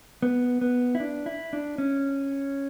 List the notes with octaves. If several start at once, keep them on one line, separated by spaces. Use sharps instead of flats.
B3
B3
E4
D4
E4
D4
C#4